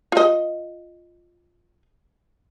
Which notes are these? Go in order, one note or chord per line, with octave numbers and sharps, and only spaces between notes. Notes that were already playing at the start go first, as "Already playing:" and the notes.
F4 D#5